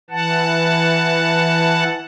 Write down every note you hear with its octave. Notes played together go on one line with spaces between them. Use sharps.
E3 F#5 A5